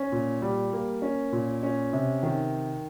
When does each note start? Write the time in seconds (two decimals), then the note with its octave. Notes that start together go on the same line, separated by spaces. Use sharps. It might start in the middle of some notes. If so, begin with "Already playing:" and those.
Already playing: C#4
0.12 A#2
0.42 G3
0.73 A#3
1.02 C#4
1.32 A#2
1.63 C#4
1.93 C3
2.23 D#3